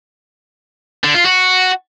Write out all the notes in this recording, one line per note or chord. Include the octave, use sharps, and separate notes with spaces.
D3
F4
F#4